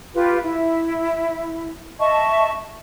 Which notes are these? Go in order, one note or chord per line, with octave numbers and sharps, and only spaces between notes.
F4 G4 B4
E4
D#5 E5 A5 C#6